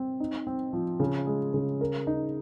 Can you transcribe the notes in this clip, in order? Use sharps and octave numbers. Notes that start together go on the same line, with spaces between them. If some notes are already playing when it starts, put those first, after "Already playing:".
Already playing: C4
D#4
C4
F3
C#3
G#3
C#3
A#4
D#4